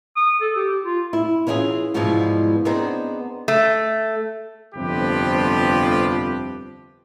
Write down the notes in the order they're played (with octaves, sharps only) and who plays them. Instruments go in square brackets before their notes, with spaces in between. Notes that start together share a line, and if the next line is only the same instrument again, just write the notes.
[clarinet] D#6
A4
G4
F4
[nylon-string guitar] E4
E3 C#4 E4 F4 G#4
G#2 B2 E3 F3 G3 G#3
B3 C4 D4 D#4 G#4 C5
[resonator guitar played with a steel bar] A3
[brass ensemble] G1 F2 C3 F3 G4 B4